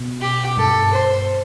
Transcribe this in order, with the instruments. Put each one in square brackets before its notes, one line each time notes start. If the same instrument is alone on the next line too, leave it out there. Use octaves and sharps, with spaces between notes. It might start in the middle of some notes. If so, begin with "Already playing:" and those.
Already playing: [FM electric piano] B2
[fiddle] G4
[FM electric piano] G2 [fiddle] A4
[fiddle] C5